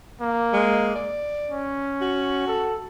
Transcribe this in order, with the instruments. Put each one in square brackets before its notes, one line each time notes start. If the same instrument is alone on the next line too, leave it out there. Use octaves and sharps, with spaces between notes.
[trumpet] A#3
[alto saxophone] G#3
D5
[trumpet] C#4
[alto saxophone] F#4
[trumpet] A4